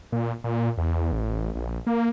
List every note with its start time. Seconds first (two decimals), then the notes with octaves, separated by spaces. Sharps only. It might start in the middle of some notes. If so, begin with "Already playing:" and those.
0.12 A#2
0.44 A#2
0.78 E2
1.12 A1
1.55 A#1
1.87 A#3